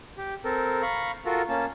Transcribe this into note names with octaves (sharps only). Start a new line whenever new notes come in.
G4
C4 A4 A#4
F5 A#5 B5 C#6
F4 F#4 A4 A#4
A#3 C#4 A5